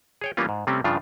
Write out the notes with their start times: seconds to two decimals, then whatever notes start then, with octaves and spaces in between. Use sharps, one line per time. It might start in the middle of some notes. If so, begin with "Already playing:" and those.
0.21 G#4 C#5 G5
0.37 E3 G3 A#3 B3 C#4 F4
0.49 G#2
0.67 C3 G3 A3 C4 C#4
0.84 G2 C#3 F3 D4 F4